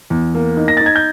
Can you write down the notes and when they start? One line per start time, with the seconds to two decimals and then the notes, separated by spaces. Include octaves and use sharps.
0.10 E2
0.35 A#3
0.57 D#4
0.68 A#6
0.77 D#4 A6
0.86 G#6
0.96 G6